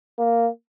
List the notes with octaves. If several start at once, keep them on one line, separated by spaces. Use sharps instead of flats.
A#3